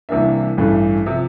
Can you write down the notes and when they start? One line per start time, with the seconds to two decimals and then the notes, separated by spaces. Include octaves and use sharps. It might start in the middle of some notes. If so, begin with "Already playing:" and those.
0.09 C2 C3 E3 A#3 D4 E5
0.57 A1 G2 E3 A3
1.06 C3 F3 E5